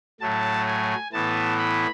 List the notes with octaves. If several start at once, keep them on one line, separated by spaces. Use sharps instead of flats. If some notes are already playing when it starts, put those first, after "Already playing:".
A2 F#3 A3 A5
G#5
A2 E3 B3 A5
B5